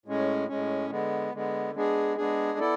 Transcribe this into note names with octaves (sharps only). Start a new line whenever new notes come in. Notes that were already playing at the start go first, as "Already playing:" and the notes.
A2 G#3 C#4
A2 G#3 C#4
D3 G#3 B3
D3 G#3 B3
G#3 B3 D4 G#4
G#3 B3 D4 G#4
B3 E4 A4 D5